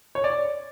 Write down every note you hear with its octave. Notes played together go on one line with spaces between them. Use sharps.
C#5
D5